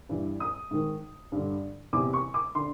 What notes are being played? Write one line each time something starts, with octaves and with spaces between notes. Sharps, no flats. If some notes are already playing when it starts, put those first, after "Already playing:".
G2 E3
D#6
G#2 D#3
G2 D3
E2 C3 E3 D6
C#6
D6
D3 C6